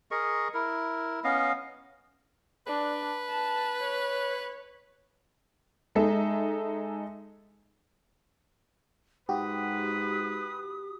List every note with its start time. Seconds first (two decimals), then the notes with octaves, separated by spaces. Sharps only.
0.11 G#4 A#4 D#5 C#6
0.54 E4 A#4
1.24 B3 C#4 D#5 F5
2.67 D4 B4
3.29 A5
3.81 C#5
5.95 G#3 D#4 A4 E5
9.29 G#2 F#4 G4 B4 D#6